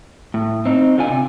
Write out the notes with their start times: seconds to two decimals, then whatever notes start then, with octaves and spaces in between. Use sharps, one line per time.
0.34 A2
0.66 C4 D#4
0.98 D3 F4 G#5
1.09 C3